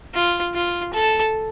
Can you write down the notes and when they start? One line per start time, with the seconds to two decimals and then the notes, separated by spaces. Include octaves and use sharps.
0.14 F4
0.54 F4
0.94 A4